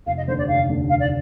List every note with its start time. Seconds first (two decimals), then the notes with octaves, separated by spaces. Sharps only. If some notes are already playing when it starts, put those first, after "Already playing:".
0.06 F1 F5
0.17 D#5
0.27 D#2 D3 C5
0.38 D5
0.48 F1 F5
0.69 D#2 D3
0.89 F1 F5
0.99 D5